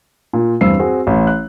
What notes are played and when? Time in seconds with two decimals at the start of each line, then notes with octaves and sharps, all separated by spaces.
0.33 A#2
0.61 E2 G2 C4 E6 C7
0.79 C4 F#4 G#4
1.07 A1
1.27 F#6